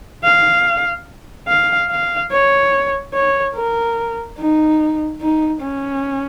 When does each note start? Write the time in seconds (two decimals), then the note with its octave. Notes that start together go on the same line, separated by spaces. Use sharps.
0.24 F5
1.48 F5
1.90 F5
2.31 C#5
3.13 C#5
3.55 A#4
4.38 D#4
5.21 D#4
5.62 C#4